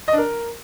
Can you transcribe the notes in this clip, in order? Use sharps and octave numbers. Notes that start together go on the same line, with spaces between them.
D#5
D4
A#4